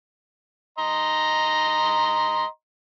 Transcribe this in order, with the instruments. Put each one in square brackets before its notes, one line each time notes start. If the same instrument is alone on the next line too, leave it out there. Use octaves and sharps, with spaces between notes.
[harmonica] D#5 A#5 C6